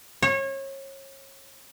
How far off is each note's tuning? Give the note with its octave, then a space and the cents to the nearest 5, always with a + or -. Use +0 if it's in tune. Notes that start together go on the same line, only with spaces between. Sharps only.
C#5 -30